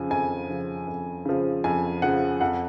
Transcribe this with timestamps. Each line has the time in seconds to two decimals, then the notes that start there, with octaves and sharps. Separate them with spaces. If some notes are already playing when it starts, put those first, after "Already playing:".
Already playing: F2 C#3 F3 G#5
0.10 F2 G#5
0.49 C#3 F3
0.88 F2
1.25 C#3 F3
1.64 F2 G#5
2.02 C#3 F3 F#5
2.41 F2 F#5